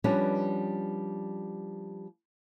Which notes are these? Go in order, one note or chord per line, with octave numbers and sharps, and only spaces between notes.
F3 G3 B3 C#4 D4 B4